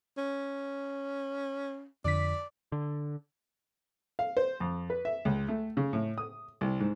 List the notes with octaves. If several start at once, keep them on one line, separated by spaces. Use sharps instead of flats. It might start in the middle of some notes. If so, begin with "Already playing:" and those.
C#4
F2 D3 D5 B6
D3
F5
C5
F2
B4
E5
C#2
A3
C#3
A2
D#6
C2
G#2